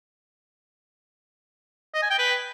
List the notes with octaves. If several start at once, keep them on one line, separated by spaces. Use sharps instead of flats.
D#5
G#5
G5
B4